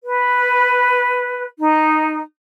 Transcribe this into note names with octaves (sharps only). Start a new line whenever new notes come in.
B4
D#4